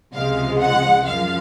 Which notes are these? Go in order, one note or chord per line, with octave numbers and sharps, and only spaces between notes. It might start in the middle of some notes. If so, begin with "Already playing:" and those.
C#2 C3 F3 G#3 F5
F#5
F#2 F3 F5